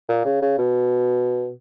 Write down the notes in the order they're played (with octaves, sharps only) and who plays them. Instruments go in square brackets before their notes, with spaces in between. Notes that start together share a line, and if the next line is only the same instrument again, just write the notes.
[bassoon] A#2
C#3
C#3
B2